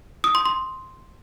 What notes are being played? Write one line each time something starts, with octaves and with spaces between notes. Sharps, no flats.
D#6
C6
C6